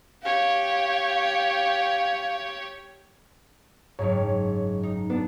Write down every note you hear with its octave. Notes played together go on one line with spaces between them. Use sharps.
G4 C#5 F5
F#1 G#2 C#5
D#4
B3 D4